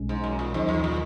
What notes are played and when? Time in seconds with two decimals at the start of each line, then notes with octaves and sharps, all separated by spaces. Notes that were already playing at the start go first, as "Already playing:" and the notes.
Already playing: B1 B2 G#3 C#4
0.09 G#2
0.24 F#2
0.39 A#2
0.54 D#2 G#2 D#3 F#3
0.69 E2
0.84 A#2